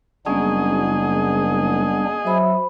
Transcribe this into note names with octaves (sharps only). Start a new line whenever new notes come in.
F#1 G3 A#3 B3 C#4 D4 G#4 D#5
F#3 C5 E5 B5